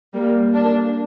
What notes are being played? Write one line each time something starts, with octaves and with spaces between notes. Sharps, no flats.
G3 A#3
A#3 D4